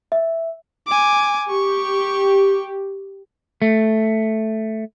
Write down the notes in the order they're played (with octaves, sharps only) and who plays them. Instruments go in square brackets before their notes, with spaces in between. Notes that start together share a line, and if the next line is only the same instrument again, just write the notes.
[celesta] E5
[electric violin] G#5 D6
[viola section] G4 [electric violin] C#6
[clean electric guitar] A3